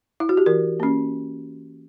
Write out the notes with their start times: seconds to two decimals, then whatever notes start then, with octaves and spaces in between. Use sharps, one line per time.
0.20 E4
0.29 F#4
0.37 G4
0.46 E3 A#4
0.80 A#3 C#4